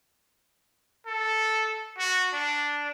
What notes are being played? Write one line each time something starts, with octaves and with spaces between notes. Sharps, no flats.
A4
F#4
D4